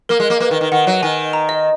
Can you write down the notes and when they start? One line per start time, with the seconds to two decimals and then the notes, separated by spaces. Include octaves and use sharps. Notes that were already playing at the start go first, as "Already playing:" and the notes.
0.09 A#3 A#4
0.20 G#3
0.30 A#3
0.40 A#3 B4
0.51 D#3
0.61 D#3
0.72 D#3 F#5
0.87 F#3
1.03 D#3 G#5
1.33 A#5
1.49 D#5